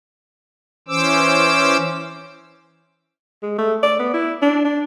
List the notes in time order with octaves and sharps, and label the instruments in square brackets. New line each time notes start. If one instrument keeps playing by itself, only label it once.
[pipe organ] E3 C#4 C5 D6 E6
[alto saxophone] G#3
A3
D5
B3
E4
D4
D4